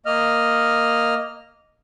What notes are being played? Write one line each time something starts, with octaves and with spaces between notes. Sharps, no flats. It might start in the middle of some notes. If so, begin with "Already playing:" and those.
A#3 D#5 F6